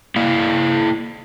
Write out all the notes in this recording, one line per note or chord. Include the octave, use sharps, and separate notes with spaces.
A#3 E4 F5